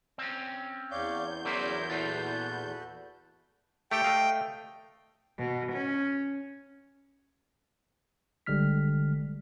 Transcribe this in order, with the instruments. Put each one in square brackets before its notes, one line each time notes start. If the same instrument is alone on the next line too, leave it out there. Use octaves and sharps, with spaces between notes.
[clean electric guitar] C4 C#4
[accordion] E2 G6 [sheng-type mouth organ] C#5 D5 F5
[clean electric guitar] F#3 E4 C5 [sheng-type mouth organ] C#4 A#4 D5
[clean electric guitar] A#2 E3 F4 [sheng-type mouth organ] F#4 A4 B4
[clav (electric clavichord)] A3 G4 A4 [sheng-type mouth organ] G5
[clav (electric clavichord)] A3 D#5 F5
[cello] B2
C#4
[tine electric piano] G1 D3 G3 G#3 F6 B6